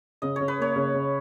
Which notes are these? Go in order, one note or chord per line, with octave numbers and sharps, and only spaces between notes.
C#3 D#5
C#3 C#5
B4
A#3 C#5
C#3
C#3